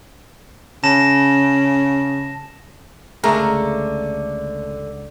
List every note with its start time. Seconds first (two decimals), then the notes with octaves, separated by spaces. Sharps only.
0.84 C#3 A5 A#6 E7
3.24 C#2 D3 A3 G#4 A#4 A#5